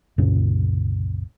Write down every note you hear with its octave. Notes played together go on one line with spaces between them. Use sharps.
C2 F#2 A#2 C#3